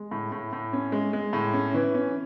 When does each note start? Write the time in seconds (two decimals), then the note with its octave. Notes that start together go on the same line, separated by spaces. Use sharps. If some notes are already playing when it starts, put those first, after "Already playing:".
Already playing: G#3
0.11 A2
0.32 A2
0.53 A2
0.73 C#4
0.92 G#3
1.13 G#3
1.33 A2
1.54 C#4
1.74 E3
1.94 C#4